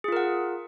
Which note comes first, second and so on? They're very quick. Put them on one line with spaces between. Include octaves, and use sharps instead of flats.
G#4 F4 A#4 F#5